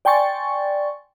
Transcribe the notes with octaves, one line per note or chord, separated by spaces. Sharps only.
D5 G5 G#5 C6 C#6 A6